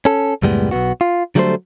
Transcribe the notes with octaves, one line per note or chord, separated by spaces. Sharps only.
C#4 A4
C#2 F#2 A2 G3 G#3 B3
B1 E2 B3 F#4
F4
D3 F#3 G3 A3 A4 C5